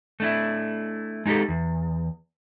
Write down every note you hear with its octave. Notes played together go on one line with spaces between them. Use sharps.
A3 D4 E4
G#3 D#4 F#4 G4 A4
E2